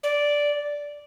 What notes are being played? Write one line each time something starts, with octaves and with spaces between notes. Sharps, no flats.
D5